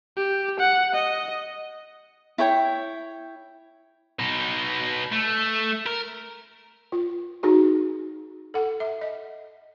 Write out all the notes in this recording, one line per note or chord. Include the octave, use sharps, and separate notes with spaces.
G4
F#5
D#5
E4 C#5 G5
B2 D#4
A3
A#4
F4
D#4 F#4 G#4
A4 F#5
E5
D#5